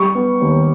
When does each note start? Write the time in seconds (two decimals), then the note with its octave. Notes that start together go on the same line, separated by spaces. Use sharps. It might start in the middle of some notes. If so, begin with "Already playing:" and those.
Already playing: G3 C#6
0.15 B3
0.41 D#2